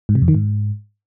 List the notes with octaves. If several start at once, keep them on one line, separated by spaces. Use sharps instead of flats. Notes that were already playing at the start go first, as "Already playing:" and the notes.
G#2
C3
F2
D#3
G#2